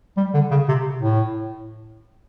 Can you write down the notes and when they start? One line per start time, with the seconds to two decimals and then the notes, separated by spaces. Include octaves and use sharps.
0.17 G3
0.34 D3
0.51 C#3
0.68 C3
1.01 A2